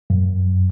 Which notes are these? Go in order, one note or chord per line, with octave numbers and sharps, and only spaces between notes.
F#2